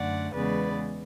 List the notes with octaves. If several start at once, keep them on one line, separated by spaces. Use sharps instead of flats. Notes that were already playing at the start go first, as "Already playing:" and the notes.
Already playing: F#2 D3 A3 D5 F#5
E2 C#3 G#3 B3 B4 D5